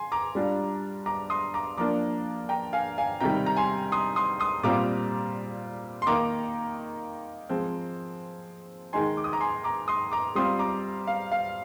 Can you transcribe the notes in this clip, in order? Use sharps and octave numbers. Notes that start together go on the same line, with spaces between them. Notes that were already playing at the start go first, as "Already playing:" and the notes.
Already playing: G#5 C6
A#5 D6
G3 D4 F4
A#5 D6
C6 D#6
A#5 D6
F3 A#3 D4 F4 A#5 D6
G5 A#5
F5 G#5
F5 G#5
C3 D#3 G3 G5 A#5
A#5
G#5 C6
C6 D#6
C6 D#6
C6 D#6
A#2 G3 C4 F4 A#5 D6
C6
D#3 A#3 D#4 A#5 D6
F3 G#3 C4
D#3 G#3 D#4 G#5 C6
D6
D#6
A#5 D6
G#5 C6
A#5 D6
C6 D#6
A#5 D6
G3 C4 F4 C6 D#6
A#5 D6
F5
F5